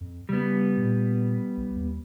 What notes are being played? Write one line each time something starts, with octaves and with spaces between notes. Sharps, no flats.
F2
C#3 G3 B3
A#2
B1
D#2